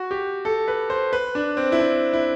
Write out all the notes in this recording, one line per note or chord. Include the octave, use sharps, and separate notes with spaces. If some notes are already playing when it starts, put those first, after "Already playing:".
Already playing: F#4
G4
A4
B4
C5
B4
D4
C4
E4
D4
E4